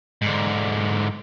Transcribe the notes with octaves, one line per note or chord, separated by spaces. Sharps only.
G#2 D3